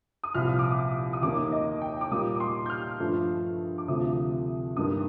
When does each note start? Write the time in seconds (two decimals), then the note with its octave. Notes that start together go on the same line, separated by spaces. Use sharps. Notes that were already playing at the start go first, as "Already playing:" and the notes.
0.24 D#6
0.34 C2 A#2 F3 F6
0.59 D6
0.64 D#6
1.13 D#6
1.22 D#2 D#3 A#3 D6
1.52 D#5
1.82 G5
2.01 D6
2.11 A#2 G3 A#3 D#6
2.35 D6
2.40 C6
2.66 G6
2.70 F6
3.00 G2 F3 A3
3.78 D6
3.88 D2 C3 F3 A3 D#6
4.76 G2 D#3 G3 A#3 D#6